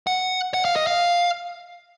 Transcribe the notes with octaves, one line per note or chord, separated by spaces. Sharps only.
F#5
F#5
F5
D#5
F5